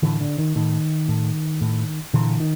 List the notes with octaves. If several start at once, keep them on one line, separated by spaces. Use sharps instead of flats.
A2 D3 E3
D3
D#3
A2 D#3
A2
A2
A#2 D3 E3
D#3